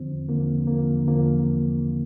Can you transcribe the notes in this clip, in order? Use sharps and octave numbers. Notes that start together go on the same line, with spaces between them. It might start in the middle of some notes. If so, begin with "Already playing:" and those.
Already playing: E2 D3 F3 C4
E2 D3 F3 A#3
E2 D3 F3 A#3
E2 D3 F3 A#3